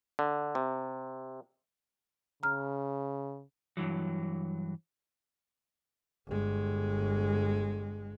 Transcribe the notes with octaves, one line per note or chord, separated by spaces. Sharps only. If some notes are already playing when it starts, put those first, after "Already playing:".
D3
C3
C#3 A#5 F6
G2 E3 F#3
G1 G#3